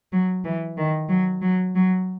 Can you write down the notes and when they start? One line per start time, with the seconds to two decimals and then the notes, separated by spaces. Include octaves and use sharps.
0.13 F#3
0.45 E3
0.78 D#3
1.10 F#3
1.42 F#3
1.75 F#3